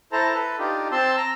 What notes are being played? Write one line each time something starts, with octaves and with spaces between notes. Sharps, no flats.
E4 A4 C5 A5 A#5
A4 B4
D4 D#4 F4 G4
C4 A5 C6 E6
A#5 E6